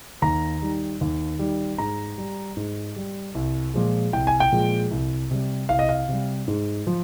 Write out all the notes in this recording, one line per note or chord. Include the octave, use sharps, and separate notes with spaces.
D#2 A#5
D#3 G3
D#2
D#3 G3
G#2 A#5
G3
G#2
G3
C2
A#2 F3 G#3
C2 G5
G#5
G5
A#2 F3 G#3
C2
C3 G3
C2 F5
D#5
F5
C3 G3
G#2
F3